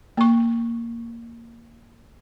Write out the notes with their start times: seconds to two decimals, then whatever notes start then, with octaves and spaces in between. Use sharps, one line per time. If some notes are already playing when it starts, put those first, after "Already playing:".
0.17 A#3 C#6